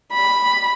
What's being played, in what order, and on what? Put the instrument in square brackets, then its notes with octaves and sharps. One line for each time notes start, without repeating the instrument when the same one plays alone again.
[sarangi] B5